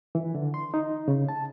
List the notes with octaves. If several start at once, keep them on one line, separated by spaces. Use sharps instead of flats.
E3
D3
C6
D#4
C#3
A5